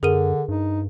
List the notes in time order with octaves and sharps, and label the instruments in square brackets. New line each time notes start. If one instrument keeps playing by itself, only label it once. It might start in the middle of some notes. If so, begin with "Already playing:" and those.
[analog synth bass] F#2 [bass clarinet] D3 [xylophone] G#4 A#4 D#7
[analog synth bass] G2 [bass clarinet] D#4